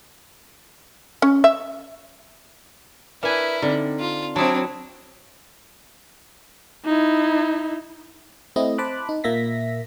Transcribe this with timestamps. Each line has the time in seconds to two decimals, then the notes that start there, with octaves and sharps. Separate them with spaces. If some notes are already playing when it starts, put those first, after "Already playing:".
1.22 C#4
1.44 E5
3.23 D4 E4 A#4 B4 E5 G#5
3.62 D3 C4 D#4
4.00 F4
4.36 F#3 C4 D4 E4 A5 D#6
6.86 D#4 E4
8.56 A3 C4 E4 D#5
8.78 C5 A5 B5 D6 F#6
9.09 D#4
9.24 A#2 A#3 E5 A#6 B6